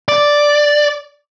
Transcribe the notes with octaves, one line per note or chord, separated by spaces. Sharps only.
D5